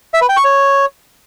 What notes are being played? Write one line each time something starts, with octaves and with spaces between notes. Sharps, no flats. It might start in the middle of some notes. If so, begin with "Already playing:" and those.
E5
B4
G5
C#6
C#5